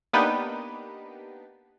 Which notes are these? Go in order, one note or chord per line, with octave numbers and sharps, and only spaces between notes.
A#3 B3 D4 D#4 G4 B4